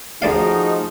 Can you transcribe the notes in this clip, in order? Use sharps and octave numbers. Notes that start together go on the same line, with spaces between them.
D2 F3 A3 D#4 F#4 G#4 D5 F5